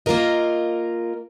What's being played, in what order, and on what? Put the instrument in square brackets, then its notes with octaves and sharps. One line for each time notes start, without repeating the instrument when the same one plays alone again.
[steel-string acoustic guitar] A#3 F4 A#4 D#5